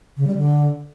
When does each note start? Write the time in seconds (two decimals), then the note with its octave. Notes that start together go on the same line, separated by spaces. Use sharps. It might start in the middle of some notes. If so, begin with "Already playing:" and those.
0.17 C#3
0.27 G3
0.37 D3